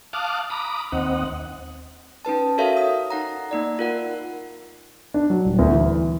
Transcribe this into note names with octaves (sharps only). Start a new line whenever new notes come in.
F5 A5 D6 D#6 F6 F#6
A#5 B5 D6 D#6
D#2 C4 D#5 F#5
C#4 D#4 B4 A5
F#4 A4 A#4 C#5 E5 F5
D#6
D#4 F#5 A#5
A#3 D#4 D5
F4 A#4 F#5
D4
F#3
D#1
D2
E3